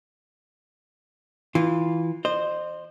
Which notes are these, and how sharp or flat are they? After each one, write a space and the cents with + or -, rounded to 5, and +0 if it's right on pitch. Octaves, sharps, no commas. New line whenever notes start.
E3 -15 F4 +0
C5 +0 D#5 -35